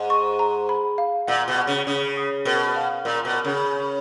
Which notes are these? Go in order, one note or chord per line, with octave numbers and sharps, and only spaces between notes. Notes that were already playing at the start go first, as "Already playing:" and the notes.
Already playing: G#2 D#5
C#6
A#5
B5
F5
A#2 F#5
B2
F#5
C#3
C#3 D#6
D#6
B2 A#4
F5
A#2 A#4
B2
A#4
C#3
B5